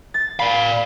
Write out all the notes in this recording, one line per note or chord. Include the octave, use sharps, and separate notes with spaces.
A6
D5 F5 B5